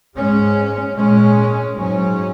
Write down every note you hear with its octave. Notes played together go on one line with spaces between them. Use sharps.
G#2 G#3 C#4
A#2 G#3 C#4
G#2 F#3 C#4